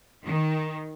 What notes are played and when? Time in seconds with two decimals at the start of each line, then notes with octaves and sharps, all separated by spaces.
0.23 D#3